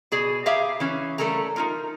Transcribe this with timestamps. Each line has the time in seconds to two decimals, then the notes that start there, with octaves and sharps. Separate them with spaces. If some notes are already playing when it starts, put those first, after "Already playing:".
0.12 B2 G#4 D5
0.46 G4 G#4 E5 F5 A#5
0.80 E3 C#4
1.18 G3 A3 A4 A#4 A#5
1.56 D#4 F4 A#4